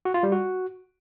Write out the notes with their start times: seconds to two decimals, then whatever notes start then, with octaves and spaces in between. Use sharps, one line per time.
0.05 F#4
0.14 F4
0.23 G3
0.32 F#4